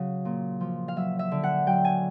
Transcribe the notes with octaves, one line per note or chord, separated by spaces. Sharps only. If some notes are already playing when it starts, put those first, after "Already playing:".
Already playing: C#3 F#3 F5
A#2
F3
F5
F#3 E5
E5
D3
F#5
F#3 G5
G#5